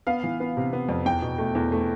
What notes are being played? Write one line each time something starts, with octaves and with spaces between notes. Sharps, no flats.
B3 F5
E3
B3
C3
B3
F2
E2 G5
B2
A3
E2
A3